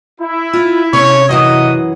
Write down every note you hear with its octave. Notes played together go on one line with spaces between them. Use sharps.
E4
F4
C3 C#4 D4 C#5
F#2 E3 F#3 F#4 D#5 E5 D#6